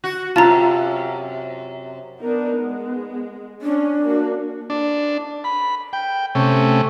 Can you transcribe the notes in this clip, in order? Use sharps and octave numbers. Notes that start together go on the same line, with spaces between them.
F#4
F#2 C3 F4 A5 A#5
B3 D4 D#4 A#4
G#3
C#4 D4
A#3 F#4
D4
B5
G5
C3 A3 C#4